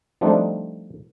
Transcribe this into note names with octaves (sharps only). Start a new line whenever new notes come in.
F3 G3 A3 C4 D4 D#4